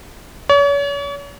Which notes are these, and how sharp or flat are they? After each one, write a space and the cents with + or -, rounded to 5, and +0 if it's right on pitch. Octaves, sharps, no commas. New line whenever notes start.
C#5 +40